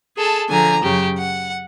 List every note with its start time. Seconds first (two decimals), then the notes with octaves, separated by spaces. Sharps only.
0.17 G#4 A4 A5
0.49 D3 F3 G#5 A#5
0.83 F#2 C#3 G4
1.18 F#5